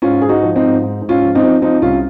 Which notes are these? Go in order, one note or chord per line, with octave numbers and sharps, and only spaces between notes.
G#2 C#4 F4
G#2 G#4
D#4 F#4
F3
C4 D#4
G#2
G#2
G#2
C#4 F4
F3
C4 D#4
F3
F3 C4 D#4
C2 C#4 F4